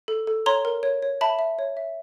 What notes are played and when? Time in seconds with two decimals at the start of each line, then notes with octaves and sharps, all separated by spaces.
0.08 A4
0.27 A4
0.46 C#5 A#5 C6
0.65 A#4
0.83 C#5
1.03 C#5
1.21 E5 A5 B5
1.39 E5
1.59 C#5
1.77 E5